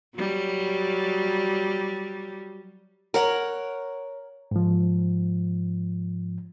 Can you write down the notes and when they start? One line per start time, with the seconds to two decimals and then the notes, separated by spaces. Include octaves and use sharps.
0.15 F#3 G3
3.14 A#4 C#5 F#5
4.51 G#2 F3